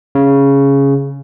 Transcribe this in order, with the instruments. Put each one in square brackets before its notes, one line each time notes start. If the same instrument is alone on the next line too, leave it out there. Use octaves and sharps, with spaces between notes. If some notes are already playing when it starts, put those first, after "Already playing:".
[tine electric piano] C#3